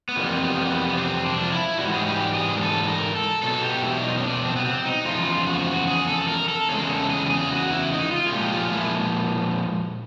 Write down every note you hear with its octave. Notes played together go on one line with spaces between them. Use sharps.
B3
F2 C3 E3 G3 A#3
B3
A#3
B3
B3
C4
D4
F4
E4
G#2 E3 G3 F#4
G#4
G4
G#4
A#4
A4
A4
A#4
A4
B2 F#3 A4
G4
E4
D4
D#4
C#4
D4
C4
B3
C4
D#4
E2 C#3 F3 F4
F#4
G#4
A4
A#4
A4
E2 C#3 G#3 G#4
A#4
A4
G#4
G4
G#4
F#4
E4
D#4
F4
G#4
A#2 F3 G#3 G4
F4
E4